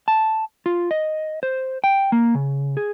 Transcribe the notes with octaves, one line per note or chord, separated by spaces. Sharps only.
A5
F4
D#5
C5
G5
A#3
C#3
G#4